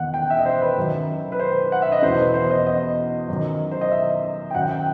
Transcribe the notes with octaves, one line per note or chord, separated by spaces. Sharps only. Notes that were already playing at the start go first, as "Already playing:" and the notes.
Already playing: E2 D#3 F#5
G5
E5
D#5
C5
B4
F#2 D#3
B4
C5
F#5
E5
D#5
E2 B2 C5
B4
C5
D#5
D#5
F#2 D#3
C5
D#5
E5
G5
F#2 D#3 F#5
G5